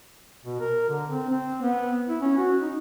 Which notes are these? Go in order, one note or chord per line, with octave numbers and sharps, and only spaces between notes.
B2
A#4
D3
C4
C4
B3
E4
C#4
F#4
D#4